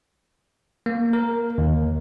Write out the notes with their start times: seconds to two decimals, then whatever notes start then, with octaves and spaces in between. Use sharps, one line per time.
0.86 A#3
1.13 A#4
1.58 D#2